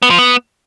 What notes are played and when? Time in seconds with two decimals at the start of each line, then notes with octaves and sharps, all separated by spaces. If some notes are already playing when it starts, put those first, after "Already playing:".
0.02 B3
0.11 F3
0.19 B3